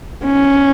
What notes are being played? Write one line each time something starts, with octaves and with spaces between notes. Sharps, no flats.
C#4